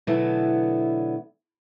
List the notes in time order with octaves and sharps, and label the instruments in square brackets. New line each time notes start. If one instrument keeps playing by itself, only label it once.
[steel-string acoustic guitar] B2 D3 E3 F#3 A3 B3